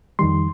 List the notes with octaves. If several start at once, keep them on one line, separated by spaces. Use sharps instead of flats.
F2 D#3 G3 C6